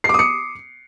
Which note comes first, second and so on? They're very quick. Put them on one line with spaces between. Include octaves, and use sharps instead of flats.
C7 D6 D#6 C#7